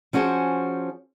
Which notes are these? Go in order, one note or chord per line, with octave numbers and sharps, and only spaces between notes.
F3 C#4 F#4 G#4 C5